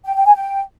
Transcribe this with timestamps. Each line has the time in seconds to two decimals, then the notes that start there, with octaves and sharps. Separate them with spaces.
0.05 G5
0.15 G5
0.26 G#5
0.36 G5